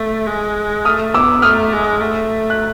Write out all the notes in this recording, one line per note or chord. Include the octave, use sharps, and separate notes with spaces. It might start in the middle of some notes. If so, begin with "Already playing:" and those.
Already playing: A3
G#3
A3 D#6 F6
B3 D6 E6
A3 D#6 F6
G#3
A3
F#6